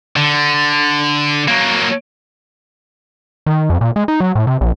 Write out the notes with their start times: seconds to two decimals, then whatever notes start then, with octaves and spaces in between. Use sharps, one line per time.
0.16 D3
1.48 F#3 A#3
3.46 D#3
3.70 F2
3.81 A#2
3.96 G#3
4.08 D#4
4.20 F#3
4.35 A2
4.47 C3
4.61 A#1